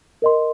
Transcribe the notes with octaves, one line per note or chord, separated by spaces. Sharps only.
A#4 D#5 C6